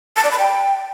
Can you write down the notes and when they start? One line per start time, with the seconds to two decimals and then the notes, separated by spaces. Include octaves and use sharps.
0.16 A5
0.24 D5
0.31 B5
0.39 G5